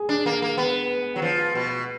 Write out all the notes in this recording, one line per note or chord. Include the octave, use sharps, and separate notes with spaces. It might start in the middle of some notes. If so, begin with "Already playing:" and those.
Already playing: G#4
D4
A#3
A#3
B3
F#3
F3
B2